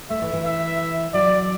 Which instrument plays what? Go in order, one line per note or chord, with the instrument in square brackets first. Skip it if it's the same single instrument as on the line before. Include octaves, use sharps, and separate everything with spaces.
[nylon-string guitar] A3 [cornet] E5
[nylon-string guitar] E3
E3
[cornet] E5
[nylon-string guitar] F#3 [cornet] D5